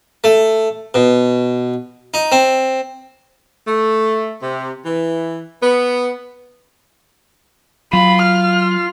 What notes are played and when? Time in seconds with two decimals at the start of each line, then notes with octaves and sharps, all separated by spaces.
0.24 A3
0.94 B2
2.14 D#4
2.32 C4
3.66 A3
4.41 C3
4.85 E3
5.62 B3
7.93 F#3 F4 B5
8.22 F6